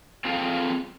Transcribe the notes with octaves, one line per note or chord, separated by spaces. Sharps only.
C4 F4 G#4 A4 F5 G5